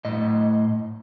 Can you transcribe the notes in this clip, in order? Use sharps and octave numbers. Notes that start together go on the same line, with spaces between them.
A2 D#5